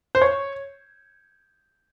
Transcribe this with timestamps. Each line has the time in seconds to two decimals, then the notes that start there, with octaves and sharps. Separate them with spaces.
0.15 C5
0.22 C#5